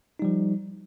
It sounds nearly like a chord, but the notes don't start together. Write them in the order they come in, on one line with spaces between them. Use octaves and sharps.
D#4 G3 F3